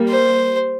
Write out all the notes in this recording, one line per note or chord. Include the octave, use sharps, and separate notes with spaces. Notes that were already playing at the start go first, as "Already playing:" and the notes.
Already playing: G3 A#3
C5